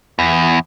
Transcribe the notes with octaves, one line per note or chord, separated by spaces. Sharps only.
E2